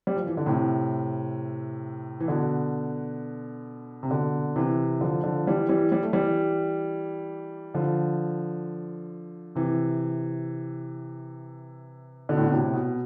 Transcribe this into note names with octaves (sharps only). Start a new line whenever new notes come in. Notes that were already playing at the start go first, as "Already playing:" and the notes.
G3
F3
E3
D3
A2 C3
E3
B2 D3
C3
B2 D3
C3 E3
D3 F3
D3 F3
E3 G3
E3 G3
G3
A3
E3 G3
D3 F3
C3 E3
B2 D3
A2
B2
A2 C3
B2